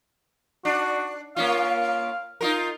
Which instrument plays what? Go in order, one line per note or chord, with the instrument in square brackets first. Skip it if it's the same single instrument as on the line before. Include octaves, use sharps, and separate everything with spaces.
[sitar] D4 [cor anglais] F#4
[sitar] A#3 C#4 F4 [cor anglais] F5
[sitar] D#4 F4 A#4